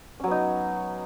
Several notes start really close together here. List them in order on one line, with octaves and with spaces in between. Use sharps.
C#4 F#3 B3 D#4